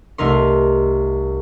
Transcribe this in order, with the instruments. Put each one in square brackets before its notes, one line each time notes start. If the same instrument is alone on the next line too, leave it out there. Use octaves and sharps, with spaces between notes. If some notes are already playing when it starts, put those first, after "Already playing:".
[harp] C2 A3 D#4 A#4 C6